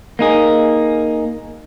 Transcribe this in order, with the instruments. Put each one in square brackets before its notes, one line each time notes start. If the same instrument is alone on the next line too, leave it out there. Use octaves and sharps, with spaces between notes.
[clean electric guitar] A#3 D#4 G#4